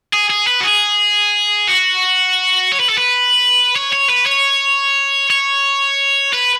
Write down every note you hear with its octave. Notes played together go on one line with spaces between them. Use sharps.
G#4
G#4
B4
F#4
G#4
F#4
C#5
B4
A4
B4
C#5
C#5
B4
C#5
C#5
B4